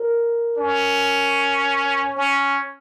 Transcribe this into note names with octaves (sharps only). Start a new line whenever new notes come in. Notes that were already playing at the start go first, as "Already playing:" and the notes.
Already playing: A#4
C#4
C#4